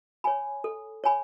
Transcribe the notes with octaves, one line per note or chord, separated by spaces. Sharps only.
C#5 G#5 B5
A4
C#5 G#5 B5